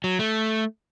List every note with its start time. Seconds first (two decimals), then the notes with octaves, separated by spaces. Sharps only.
0.04 F#3
0.19 A3